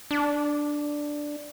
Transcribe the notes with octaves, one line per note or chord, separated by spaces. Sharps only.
D4